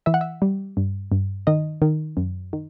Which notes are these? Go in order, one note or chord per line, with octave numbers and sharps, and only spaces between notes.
E3 E5
F#5
E5
G3
G2
G2
D#3 D#5
D#3
F#2
D#3